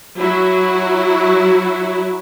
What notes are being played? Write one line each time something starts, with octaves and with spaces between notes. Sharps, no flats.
F#3 E4 F#4